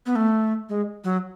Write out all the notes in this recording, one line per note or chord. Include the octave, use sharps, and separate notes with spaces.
B3
A3
G#3
F#3